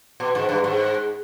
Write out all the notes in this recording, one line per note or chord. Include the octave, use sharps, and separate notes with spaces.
B2
G#2
G2
G#2